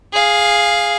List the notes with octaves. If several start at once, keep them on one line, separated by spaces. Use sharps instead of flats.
G#4 F5